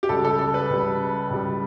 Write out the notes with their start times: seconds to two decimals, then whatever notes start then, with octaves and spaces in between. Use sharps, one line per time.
0.03 G4
0.09 C#2 C#3 G3 A4
0.25 A4
0.39 A4
0.54 B4
0.70 C#2 C#3 G3
1.30 C#2 C#3 G3